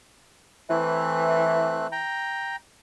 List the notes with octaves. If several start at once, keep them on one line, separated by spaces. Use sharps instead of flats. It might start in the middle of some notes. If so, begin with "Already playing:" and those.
E3 A3 C4 F#6
G5 A#5